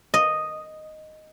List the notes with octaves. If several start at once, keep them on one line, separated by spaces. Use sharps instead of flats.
D#5